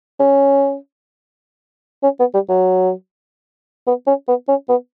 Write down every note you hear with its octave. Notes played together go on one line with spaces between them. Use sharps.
C#4
C#4
B3
G3
F#3
B3
C#4
B3
C#4
B3